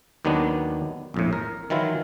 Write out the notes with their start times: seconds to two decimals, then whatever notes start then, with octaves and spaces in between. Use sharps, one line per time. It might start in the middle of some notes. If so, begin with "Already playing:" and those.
0.25 D#2 D#3 F#3 B3 D4
1.14 A#1 F2 A2
1.33 A#4
1.70 D#3 E3 F#3 E4 F4